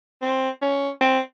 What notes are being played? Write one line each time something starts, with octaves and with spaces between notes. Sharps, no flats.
C4
C#4
C4